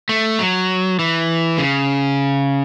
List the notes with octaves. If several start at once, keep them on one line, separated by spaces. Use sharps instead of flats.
A3
F#3
E3
C#3